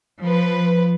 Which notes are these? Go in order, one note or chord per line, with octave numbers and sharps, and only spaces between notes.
F3 B4